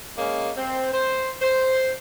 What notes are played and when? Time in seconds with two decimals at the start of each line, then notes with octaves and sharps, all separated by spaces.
0.18 G#3 A#3 C#4
0.57 C4
0.93 C5
1.41 C5